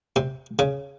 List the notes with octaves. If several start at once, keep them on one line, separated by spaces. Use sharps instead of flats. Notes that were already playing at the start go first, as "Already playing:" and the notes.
C3
C#3